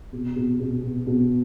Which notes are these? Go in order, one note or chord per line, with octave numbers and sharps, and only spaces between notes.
B2
B2
B2
B2
B2